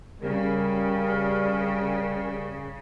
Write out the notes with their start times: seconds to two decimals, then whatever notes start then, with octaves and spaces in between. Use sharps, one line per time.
0.21 C#3 G3 A#4